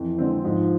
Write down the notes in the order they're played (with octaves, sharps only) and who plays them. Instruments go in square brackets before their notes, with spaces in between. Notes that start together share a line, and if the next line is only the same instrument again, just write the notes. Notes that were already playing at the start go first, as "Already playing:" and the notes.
Already playing: [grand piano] F2 [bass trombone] E3
[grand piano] D3 G#3 C4
[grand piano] G#2 [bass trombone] F3